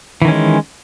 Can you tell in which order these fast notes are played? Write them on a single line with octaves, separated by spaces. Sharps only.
E3 D#3 C#4 G#3